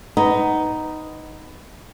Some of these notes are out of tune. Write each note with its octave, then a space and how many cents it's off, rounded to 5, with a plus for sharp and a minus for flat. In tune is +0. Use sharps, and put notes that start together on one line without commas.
B3 +15 D#4 +0